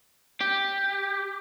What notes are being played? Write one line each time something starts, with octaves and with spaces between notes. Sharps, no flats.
G4